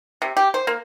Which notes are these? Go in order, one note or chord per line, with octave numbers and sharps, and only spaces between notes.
C3
G4
C5
A#3